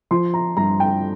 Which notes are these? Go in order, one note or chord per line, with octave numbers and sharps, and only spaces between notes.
F3 C6
A#5
G2 A#5
G5